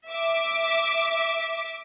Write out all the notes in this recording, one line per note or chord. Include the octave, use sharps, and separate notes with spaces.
E5 D6